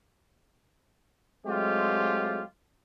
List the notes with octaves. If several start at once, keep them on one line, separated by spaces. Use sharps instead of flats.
F#3 G#3 A3 C4 F4 G4